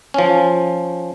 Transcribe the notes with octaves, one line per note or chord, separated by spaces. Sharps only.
F3 C#4